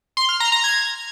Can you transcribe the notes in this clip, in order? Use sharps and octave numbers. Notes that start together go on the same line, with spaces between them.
C6
F6
A#5
A#5
G#6